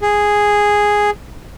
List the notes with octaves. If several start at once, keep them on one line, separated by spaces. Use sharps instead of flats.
G#4